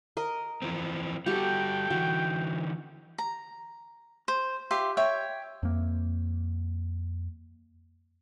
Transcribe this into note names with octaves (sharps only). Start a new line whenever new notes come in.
A#4 D#5
E3 F3 C4
G3 F#4 G4 A4 G5
D3 E3 F#4
A#5
C5
F4 G4 E5 C6
C#5 E5 G5
F2 A#3